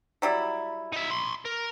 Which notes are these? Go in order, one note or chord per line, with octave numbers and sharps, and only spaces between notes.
F#3 G3 E4
D#4 E5
B5 C6
A#4